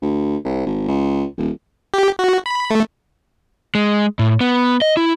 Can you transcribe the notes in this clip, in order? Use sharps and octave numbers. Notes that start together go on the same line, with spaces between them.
D2
C2
G#1
C#2
D#1
G4
F#4
B5
A3
G#3
A2
B3
D#5
E4